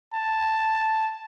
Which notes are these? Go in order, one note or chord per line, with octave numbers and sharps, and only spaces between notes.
A5